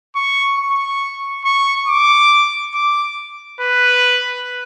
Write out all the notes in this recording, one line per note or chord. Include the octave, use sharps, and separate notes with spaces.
C#6
C#6
C#6
D6
D6
B4